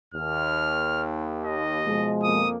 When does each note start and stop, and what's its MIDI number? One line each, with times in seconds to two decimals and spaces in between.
0.14 2.06 39
0.14 1.04 89
1.45 2.14 75
1.85 2.46 47
1.85 2.46 53
1.85 2.46 56
2.23 2.57 41
2.23 2.57 58
2.23 2.49 87